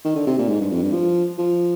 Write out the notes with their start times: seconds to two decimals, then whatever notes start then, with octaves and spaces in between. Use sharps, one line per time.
0.04 D#3
0.16 D3
0.27 C3
0.39 A#2
0.49 G#2
0.61 G2
0.71 F2
0.82 G2
0.93 F3
1.38 F3